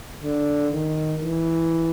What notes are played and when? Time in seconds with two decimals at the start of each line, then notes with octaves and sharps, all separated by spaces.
0.24 D3
0.72 D#3
1.20 E3